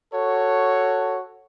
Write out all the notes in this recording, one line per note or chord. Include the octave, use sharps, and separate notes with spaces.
F#4 A4 C#5